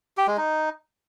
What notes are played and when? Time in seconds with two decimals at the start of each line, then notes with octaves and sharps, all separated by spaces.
0.17 G4
0.27 G#3
0.37 D#4